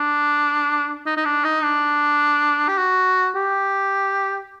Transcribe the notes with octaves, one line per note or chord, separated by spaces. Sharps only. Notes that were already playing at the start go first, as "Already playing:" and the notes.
Already playing: D4
D#4
D#4
D4
D#4
D4
G4
F#4
G4